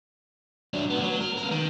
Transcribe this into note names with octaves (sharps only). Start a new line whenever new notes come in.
F#3 D4
D2 B3
F#3
A#4
B3 A#4
D#3